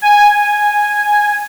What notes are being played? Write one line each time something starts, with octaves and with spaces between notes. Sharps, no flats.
G#5